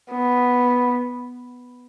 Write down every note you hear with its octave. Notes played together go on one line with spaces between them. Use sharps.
B3